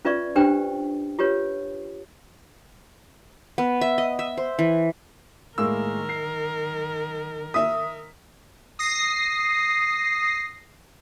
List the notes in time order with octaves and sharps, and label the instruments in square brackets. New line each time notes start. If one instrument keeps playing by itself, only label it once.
[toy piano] C#4 F4 B4 D5 E5 C#6
D4 G4 B4 C5 G5
F4 G4 B4 C#5
[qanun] B3
E5
D#5
E5
C5
E3
[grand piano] A2 G#3 A#3 [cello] D#3 A#4 [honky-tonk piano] E6
[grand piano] C7
[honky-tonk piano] E5 D#6 [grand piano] B6
[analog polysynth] D#6 A#6 C7